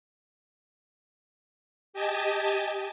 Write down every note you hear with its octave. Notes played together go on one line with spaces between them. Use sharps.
G4 D#5 G#5 A5